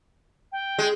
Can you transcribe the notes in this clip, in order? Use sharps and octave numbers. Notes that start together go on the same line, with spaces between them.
G5
G#3